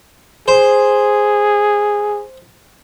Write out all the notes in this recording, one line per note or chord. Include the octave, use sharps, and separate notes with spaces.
G#4 C5